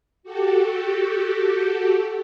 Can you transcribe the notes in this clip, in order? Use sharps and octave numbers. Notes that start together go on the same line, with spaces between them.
F#4 G4 A4